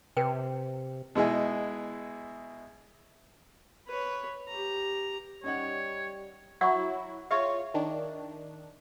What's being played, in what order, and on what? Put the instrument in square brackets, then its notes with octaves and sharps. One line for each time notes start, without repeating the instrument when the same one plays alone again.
[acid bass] C3 [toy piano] B4 G5
[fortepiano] B2 G#3 E4 G#4
[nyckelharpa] B4 C#5
G4 A#5
[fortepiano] F#2 D#4 F#5 [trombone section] G3 [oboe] C#5
[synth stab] F#3 E4 F#4 [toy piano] F#5 C#6
[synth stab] F4 C#5 F5 [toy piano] G#4 E5 C#6
[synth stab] D#3 D4